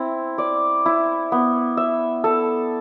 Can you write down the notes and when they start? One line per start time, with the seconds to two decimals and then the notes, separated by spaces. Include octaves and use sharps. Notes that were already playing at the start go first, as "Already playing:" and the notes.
Already playing: C4 E4
0.38 D5
0.86 E4
1.32 B3
1.77 E5
2.24 A4